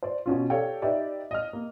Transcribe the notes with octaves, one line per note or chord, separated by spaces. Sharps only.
C5 D5
B2 C#4 F4
G4 A4 C#5 D5 F5 G5
D#4 G4 B4 D5 E5
D#5 F6
A#3